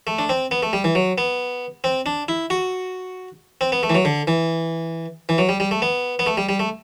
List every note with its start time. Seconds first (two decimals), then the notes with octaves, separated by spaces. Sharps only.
0.07 A3
0.19 D4
0.29 C4
0.51 B3
0.63 A3
0.73 G3
0.84 E3
0.95 F#3
1.18 B3
1.84 C4
2.06 D4
2.28 E4
2.50 F#4
3.61 C4
3.72 B3
3.83 A3
3.90 E3
3.95 F#3
4.05 D3
4.27 E3
5.29 E3
5.38 F#3
5.49 G3
5.60 G3
5.71 A3
5.82 B3
6.19 B3
6.26 A3
6.37 G3
6.49 G3
6.59 A3